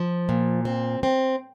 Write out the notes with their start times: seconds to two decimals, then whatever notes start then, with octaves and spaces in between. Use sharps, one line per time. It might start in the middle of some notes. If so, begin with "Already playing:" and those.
Already playing: F3
0.29 A#2
0.65 C4
1.03 C4